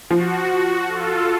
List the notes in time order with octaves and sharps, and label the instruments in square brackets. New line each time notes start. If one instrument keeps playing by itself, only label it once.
[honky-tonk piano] F3 [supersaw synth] F#4
[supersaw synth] F4 A4